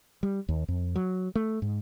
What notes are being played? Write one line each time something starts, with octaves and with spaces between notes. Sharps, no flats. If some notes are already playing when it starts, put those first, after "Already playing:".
G3
D#2
F2
F#3
A3
G#2